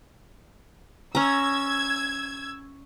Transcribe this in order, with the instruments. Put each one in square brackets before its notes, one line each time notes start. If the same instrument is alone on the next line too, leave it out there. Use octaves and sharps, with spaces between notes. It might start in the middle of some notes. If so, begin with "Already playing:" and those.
[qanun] C#4 A#5 [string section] E6 G#6